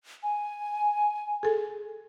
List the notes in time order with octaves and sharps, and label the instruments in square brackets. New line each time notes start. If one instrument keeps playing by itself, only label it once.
[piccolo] G#5
[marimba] G#4 A4